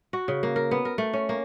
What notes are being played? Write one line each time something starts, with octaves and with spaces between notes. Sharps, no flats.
F#4
C#3
A#3
A#4
B3
A#4
A3
C#4
A#3